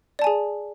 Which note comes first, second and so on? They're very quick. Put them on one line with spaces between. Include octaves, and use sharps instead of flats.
D5 A5 G#5 G#4